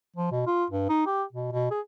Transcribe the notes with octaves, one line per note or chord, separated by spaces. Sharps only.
F3
B2
F4
G2
D#4
G4
B2
B2
G#4